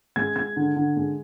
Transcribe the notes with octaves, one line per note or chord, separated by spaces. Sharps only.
G#3 G#6
G#3 G#6
D3
D3
G#3